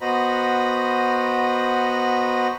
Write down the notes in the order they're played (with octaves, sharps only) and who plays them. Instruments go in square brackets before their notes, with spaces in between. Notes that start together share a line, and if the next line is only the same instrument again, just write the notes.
[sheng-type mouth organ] B3 F#4 C5 D#5 A#5 B5